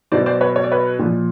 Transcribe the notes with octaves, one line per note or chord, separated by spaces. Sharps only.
B2 F#3 C5 D5
C5 D5
B4 C#5
C#5
D5
B4 C#5
A#2 F3